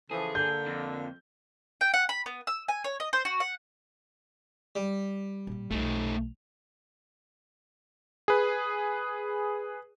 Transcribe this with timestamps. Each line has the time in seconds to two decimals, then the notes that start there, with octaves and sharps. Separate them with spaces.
0.11 C#3 E3 F3 G#4 A4
0.35 D3 A#3 G6
0.66 F2
1.81 G5
1.94 F#5
2.09 B5
2.26 B3
2.47 E6
2.68 G#5
2.84 C#5
3.00 D#5
3.13 C5
3.25 F#4
3.40 F#5
4.76 G3
5.47 A1 A#2
5.71 B1 B2 A3 D#4
8.28 G#4 B4